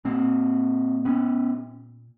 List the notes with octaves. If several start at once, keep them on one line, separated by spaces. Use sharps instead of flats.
A#2 A#3 C4
B3 C#4